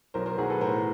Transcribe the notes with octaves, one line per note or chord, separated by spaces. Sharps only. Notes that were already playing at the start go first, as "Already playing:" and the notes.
B1 A#4 C5
A#4 C5
B1 F#4 G#4
A4 B4
A2 A#4 C5